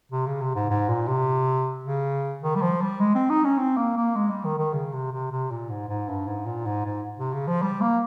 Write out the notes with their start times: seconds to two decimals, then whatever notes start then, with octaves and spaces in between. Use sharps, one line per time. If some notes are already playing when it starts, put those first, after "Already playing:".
0.12 C3
0.26 C#3
0.41 C3
0.55 G#2
0.70 G#2
0.89 A#2
1.08 C3
1.85 C#3
2.43 D#3
2.55 G3
2.62 F3
2.82 G3
3.00 G#3
3.15 C4
3.30 D#4
3.44 C#4
3.58 C4
3.77 A#3
3.97 A#3
4.16 G#3
4.30 G3
4.44 D#3
4.58 D#3
4.73 C#3
4.93 C3
5.12 C3
5.31 C3
5.51 A#2
5.70 G#2
5.89 G#2
6.08 G2
6.27 G#2
6.46 A#2
6.66 G#2
6.85 G#2
7.19 C3
7.33 C#3
7.48 F3
7.62 G3
7.81 A#3